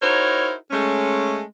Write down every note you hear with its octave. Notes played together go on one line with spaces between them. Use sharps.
D#4 E4 F#4 A#4 C5 C#5
G#3 A3 C#4